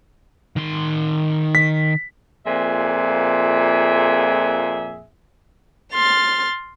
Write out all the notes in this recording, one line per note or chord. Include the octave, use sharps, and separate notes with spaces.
D#3 C6
B6
F2 A#2 G#4 E5
C6 F6 A6